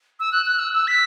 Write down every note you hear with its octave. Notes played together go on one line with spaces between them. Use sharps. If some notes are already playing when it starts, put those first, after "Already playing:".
E6
F#6
F#6
E6
E6
B6